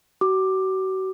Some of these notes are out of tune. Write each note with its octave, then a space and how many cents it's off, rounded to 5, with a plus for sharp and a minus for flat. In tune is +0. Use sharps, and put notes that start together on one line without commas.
F#4 +40 D6 +10